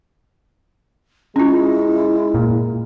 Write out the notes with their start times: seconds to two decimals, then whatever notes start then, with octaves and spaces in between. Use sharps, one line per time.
1.36 G#3 C#4 E4 F4
2.34 A#2